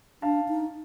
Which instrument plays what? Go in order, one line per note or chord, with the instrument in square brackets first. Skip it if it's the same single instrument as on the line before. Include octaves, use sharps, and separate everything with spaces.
[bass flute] D4 [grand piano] F5 A5
[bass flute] D#4